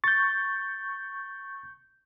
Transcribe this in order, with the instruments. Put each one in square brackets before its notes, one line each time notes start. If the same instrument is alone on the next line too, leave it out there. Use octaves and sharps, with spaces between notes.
[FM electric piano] C#6 G6 [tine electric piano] A6